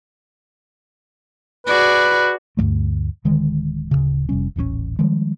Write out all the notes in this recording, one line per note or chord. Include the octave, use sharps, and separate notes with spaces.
F#4 G#4 B4 D5
D2 G2 G3 A3
D1 D3 D#3 G#3
D1 C2 C#3
F1 C3 G3 C#4
D#1 A1 C3 C#4
D#3 F3 G3 G#3